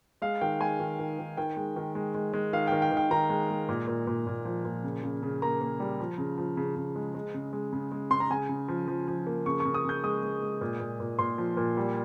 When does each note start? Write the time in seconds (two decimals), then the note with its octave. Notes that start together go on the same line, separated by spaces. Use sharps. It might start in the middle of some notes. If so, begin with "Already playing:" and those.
0.22 G#3 F5
0.41 D#3 G5
0.61 G#3 G#5
0.80 D#3
0.99 D#3
1.19 D#3
1.37 D#3 G5
1.57 G#3
1.76 D#3
1.95 G#3
2.14 G#3
2.33 G#3
2.53 D#3 F5
2.68 D#3 G5
2.82 G5
2.91 D#3
2.97 G5
3.11 D#3 A#5
3.30 G#3
3.50 G#3
3.69 A#2
3.87 A#2
4.07 A#2
4.27 A#2
4.45 F3
4.65 A#2
4.83 C#3
5.03 C#3
5.23 C#3
5.42 A#3 A#5
5.61 A#3
5.80 G3
6.00 F3
6.18 C#3
6.38 F3
6.57 C#3
6.76 C#3
6.96 G#3
7.15 G#3
7.34 C#3
7.53 G#3
7.73 C#3
7.92 G#3
8.11 C#3 C6
8.20 A#5
8.30 C#3 G#5
8.49 C#3
8.68 F3
8.88 F3
9.08 F3
9.27 A#3
9.46 C#3 C#6
9.60 C#6
9.65 C#3
9.74 D#6
9.85 C#3 G6
10.04 G#3 D#6
10.23 G#3
10.42 G#3
10.61 A#2
10.80 A#2
11.00 A#2
11.19 A#2 C6
11.38 F3
11.57 A#2
11.77 G3